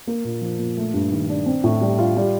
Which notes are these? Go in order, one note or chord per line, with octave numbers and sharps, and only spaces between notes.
A#3
A#2
F3
A#2
A3
G2
D#3
D4
C4
A2
G3
F4
G3